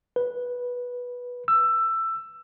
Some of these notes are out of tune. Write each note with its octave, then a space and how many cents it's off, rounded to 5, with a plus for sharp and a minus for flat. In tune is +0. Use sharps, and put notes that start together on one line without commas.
B4 -10
E6 +15